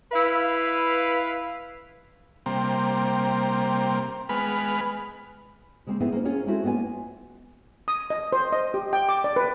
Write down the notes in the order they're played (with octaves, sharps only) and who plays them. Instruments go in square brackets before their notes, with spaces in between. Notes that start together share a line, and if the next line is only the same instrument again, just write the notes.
[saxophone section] E4 B4 F5
[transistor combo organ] C3 G3 A#3 C4
G#3 B3 B4 F6
[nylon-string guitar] C#3 G#3 A#3 C4
B3 C4 D#4 E4 G#4
A#3 C#4 C5
C4 C#4 F4 G#4 A#4 C#5
G#3 C4 C#4 E4 F#4 A4
A#3 B3 F4 F#5 G#5
[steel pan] D#6
D#5
C5
D#5
G4
G5
D6
D5
B4